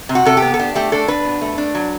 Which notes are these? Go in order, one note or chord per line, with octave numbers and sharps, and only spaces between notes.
C3
F#4
C3 A4
G4
B3
A4
D4 G4
A3 G4
D4 A4
D4 B4
B2
A3
D4
F#3